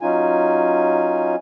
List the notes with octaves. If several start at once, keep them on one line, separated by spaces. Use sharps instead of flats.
F#3 C#4 D#4 F4 G#5